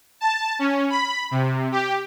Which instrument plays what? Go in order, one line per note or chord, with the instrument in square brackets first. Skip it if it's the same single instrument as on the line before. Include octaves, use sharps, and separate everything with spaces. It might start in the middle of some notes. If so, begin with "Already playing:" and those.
[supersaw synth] A5
C#4
B5
C3
G4